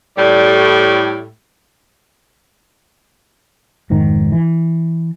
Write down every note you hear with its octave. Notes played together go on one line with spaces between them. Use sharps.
A2 G3
F1 G#2 D#3
E3